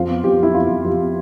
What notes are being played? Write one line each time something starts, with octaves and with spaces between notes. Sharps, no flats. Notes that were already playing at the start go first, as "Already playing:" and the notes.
Already playing: F2 F4
B3
F2 G4
B3 E4
F2 F4
F2
F2 G4
B3